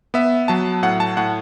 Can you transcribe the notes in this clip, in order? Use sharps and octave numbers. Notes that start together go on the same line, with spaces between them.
B3 E5
F#3 A5
A2 F#5
A5
A2 F#5